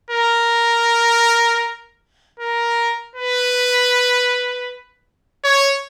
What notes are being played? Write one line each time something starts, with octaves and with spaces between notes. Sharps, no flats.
A#4
A#4
B4
C#5